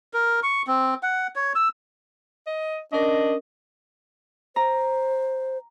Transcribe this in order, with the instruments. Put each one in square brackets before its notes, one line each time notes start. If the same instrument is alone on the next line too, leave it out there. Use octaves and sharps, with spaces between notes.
[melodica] A#4
C#6
C4
F#5
C#5
E6
[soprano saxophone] D#5
[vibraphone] C#4 A#4 [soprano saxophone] D4 [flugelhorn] D#5
[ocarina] C5 [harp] A#5